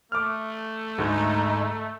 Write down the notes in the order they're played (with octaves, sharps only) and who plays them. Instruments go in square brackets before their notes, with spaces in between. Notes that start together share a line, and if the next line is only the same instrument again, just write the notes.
[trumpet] A3 [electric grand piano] D6 F6
[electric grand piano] D2 G#3 [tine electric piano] G#2 [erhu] D#4